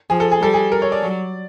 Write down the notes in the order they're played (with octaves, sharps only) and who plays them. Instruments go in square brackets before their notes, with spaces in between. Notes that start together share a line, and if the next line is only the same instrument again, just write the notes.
[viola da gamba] F3 [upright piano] G#4
[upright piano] A4
G#4
[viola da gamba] G3 [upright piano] A4
[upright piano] G#4
A#4
C#5
D5
[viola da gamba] F#3